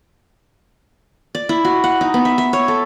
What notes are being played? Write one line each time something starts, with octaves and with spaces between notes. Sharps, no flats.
D5
E4
F#4
F#5
D#4
B3
E5
E5
C#5
A4